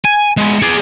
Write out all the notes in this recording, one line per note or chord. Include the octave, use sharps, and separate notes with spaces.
G#5
G#3 B3
G#4 D5